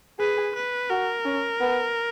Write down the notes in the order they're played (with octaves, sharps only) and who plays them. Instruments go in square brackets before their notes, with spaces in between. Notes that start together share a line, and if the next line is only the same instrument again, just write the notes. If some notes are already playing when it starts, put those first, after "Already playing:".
[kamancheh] G#4 [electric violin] B4
[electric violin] B4
[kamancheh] F#4 [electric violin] A#4
[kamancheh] C#4
B3